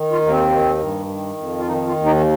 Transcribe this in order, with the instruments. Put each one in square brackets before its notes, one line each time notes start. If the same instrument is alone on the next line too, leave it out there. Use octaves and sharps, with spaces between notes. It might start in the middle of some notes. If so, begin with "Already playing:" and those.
Already playing: [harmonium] D#3
F4
D#2
A#3
C4
D#3
G2
D#3
F2
F4
D#3 D#4
F4
D#2
D#4